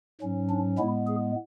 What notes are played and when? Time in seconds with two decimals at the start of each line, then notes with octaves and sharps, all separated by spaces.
0.21 G#2 F#3 C#4
0.50 D4
0.78 A2 G#3 B3 E4
1.08 G#4